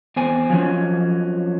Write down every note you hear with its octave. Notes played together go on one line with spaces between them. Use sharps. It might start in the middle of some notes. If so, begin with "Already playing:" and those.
E2 C4 G#5
F3 F#3 C4 C#4